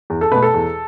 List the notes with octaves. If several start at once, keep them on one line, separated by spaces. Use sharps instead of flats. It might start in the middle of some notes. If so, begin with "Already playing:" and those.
E2
A4
B2 A3 B4
A4
E2